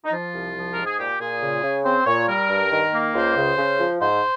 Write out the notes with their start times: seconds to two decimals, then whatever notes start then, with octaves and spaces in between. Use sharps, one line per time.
0.05 D#4
0.12 F3 F4
0.33 C2
0.56 F3
0.74 G#2 A#4
0.86 G#4
0.98 A#2 G4
1.20 A#2 G#4
1.42 C#3
1.63 C#3
1.85 C4 C5
2.06 A#2 C#5
2.28 G3 A#4
2.49 G2
2.72 D#3
2.93 A#3
3.15 C#2 C5
3.37 C#3
3.58 C#3
3.80 F3
4.01 G#2 C5